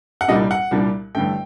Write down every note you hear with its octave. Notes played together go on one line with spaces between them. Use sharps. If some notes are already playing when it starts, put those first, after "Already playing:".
F#5
C2 A#2 G3 D4 D#5
F#5
C2 A#2 G3 D4
A1 G2 D3 A3 G5